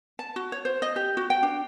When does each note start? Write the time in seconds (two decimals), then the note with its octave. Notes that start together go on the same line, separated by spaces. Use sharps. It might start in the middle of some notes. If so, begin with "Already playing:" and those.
0.19 A5
0.36 F#4
0.52 C#5
0.65 C5
0.82 D#5
0.96 G4
1.17 F#4
1.30 G5
1.43 D4